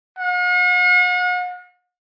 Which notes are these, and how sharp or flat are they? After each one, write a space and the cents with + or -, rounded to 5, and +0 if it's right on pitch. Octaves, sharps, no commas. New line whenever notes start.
F#5 -45